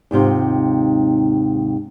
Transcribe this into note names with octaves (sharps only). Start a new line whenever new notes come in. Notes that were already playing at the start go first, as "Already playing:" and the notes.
D#2 G#2 C3 F4